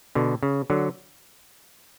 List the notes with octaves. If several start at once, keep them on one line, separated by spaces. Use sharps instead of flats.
B2 D3
C#3
D3 F#3